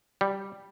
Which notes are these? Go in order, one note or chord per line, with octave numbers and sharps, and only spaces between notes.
G3